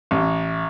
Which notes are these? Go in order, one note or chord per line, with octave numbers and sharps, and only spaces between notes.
A1